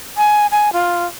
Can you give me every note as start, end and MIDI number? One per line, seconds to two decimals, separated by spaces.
0.17 0.47 80
0.52 0.73 80
0.73 1.05 65